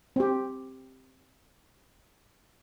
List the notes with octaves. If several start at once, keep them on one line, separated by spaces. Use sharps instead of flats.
C4 G4